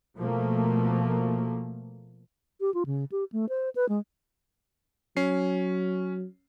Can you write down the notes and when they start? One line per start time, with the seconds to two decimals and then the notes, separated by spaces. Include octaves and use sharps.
0.17 B2 F3 A3 A#3
2.61 G4
2.74 F4
2.86 C#3
3.12 G4
3.32 A3
3.49 C5
3.76 B4
3.89 G#3
5.17 F#3 C#4 C7